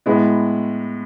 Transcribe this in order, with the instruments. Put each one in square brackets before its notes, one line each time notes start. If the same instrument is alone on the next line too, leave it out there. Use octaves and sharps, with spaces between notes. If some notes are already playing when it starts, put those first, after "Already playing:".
[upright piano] A2 G#3 B3